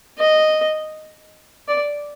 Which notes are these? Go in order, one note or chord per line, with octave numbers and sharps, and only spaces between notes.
D#5
D5